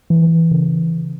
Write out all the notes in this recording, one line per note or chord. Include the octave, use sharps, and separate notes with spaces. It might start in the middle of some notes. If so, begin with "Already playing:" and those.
E3
C#3